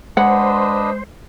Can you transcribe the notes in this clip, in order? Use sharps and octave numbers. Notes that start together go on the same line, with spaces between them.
G#3 D4 B4 C5 D#5 F#5